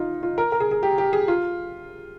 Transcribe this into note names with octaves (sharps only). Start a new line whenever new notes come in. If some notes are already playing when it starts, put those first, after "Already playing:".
Already playing: D#4 F4
F4
A#4
A#4
G#4
G#4
G4
G4
G#4
F4